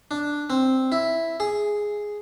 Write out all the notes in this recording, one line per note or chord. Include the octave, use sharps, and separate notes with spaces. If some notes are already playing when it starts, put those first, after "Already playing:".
D4
C4
E4
G#4